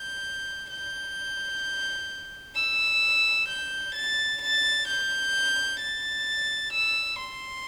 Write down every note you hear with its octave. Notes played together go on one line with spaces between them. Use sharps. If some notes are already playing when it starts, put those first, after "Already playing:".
Already playing: G6
G6
E6
G6
A6
A6
G6
A6
E6
C6